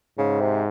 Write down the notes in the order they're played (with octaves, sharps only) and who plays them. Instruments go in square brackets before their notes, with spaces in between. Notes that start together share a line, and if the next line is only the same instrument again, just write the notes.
[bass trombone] G#2 [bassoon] C#3
[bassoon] C3